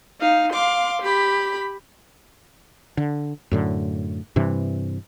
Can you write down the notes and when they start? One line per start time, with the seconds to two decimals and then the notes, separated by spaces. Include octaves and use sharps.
0.20 D#4 F5
0.54 F5 C6 D6
1.02 G4 B5
2.97 D3
3.51 F#2 A2 D3
4.36 G2 C3 E3